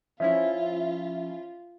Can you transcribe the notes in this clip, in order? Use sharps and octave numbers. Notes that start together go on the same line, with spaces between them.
F3 C#4 E4 F4 E5